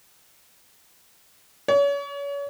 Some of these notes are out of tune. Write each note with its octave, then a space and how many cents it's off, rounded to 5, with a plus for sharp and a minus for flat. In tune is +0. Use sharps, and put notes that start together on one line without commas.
C#5 +35